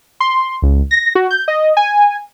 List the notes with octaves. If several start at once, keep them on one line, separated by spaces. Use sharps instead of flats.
C6
C#2
A#6
F#4
G6
D#5
G#5